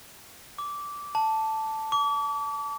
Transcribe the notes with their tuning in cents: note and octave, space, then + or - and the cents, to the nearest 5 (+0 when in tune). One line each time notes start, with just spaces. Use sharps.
D6 -15
A5 +0
D6 -40